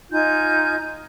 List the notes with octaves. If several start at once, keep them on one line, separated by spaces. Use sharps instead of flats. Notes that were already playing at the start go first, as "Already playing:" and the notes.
D#4 F4 G#5 G6